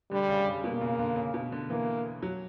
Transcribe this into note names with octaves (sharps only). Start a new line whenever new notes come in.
D3 G3
C#3
C#3
B2 A#3
C#3
D3
C#3
B2
D3
E3 A#3
F#3